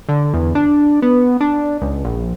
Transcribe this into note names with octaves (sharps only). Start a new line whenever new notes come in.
D3
E2
D4
B3
D4
C#2
A#1